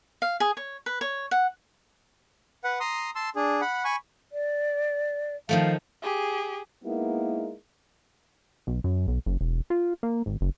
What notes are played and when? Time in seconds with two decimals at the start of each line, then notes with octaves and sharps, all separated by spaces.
0.22 F5
0.40 G#4
0.57 C#5
0.86 B4
1.01 C#5
1.31 F#5
2.64 B4 F#5
2.80 A#5 C6 D#6
3.15 A5 C6 E6
3.36 D4 G#4
3.61 F#5 B5
3.85 G#5 B5 C#6
4.32 D5
5.49 D#3 F3 A3 F5
6.02 G4 G#4
6.84 G#3 A#3 B3 D#4 E4 A#4
8.67 B1
8.84 F#2
9.08 B1
9.26 F#1
9.41 E1
9.70 F4
10.03 A#3
10.26 G#1
10.41 F#1